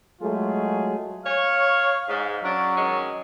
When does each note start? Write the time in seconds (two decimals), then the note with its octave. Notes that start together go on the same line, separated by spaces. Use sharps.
0.21 F#3 G#3 A3 F4 G#4
1.25 C#5 F5
2.09 G#2
2.44 F#3 C#4 D4
2.76 D#3 G#3 C#4